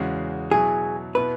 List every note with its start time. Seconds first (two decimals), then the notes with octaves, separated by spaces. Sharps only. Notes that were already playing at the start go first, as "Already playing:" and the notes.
Already playing: E2 C#3 G#3 C#4 F#4
0.51 B2 F#3 E4 G#4
1.15 B2 B3 E4 B4